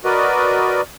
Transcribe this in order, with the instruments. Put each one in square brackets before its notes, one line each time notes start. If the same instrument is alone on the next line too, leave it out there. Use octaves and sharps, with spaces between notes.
[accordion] F#4 A#4 B4 D5 D#5